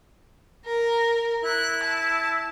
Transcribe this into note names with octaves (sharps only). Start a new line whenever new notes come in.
A#4
E4 F#6
A5